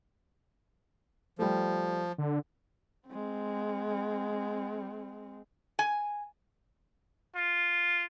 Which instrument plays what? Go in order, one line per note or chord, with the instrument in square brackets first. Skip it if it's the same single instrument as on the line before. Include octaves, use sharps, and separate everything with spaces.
[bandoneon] F3 [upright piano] G3 A3
[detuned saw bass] D3
[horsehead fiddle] G#3 C4
[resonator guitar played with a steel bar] G#5
[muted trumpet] F4